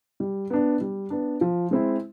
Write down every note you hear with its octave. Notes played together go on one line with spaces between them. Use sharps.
G3
B3 D4
G3
B3 D4
F3
G#3 C4 E4